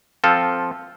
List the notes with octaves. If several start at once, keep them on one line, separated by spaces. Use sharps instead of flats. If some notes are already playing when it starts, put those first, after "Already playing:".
F3 C4 F4 A4